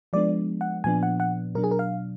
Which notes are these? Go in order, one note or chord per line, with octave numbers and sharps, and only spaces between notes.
F3 G#3 B3 D4 D5
F#5
A#2 F3 B3 D4 G#5
F#5
F#5
B2 F#3 D4 A#4
G#4
A#4
F5